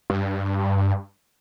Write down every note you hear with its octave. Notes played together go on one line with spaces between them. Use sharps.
G2